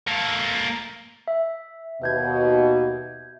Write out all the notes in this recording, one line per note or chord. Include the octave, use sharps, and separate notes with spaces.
A#3 A4
E5
D#2 B2 E5 G6 G#6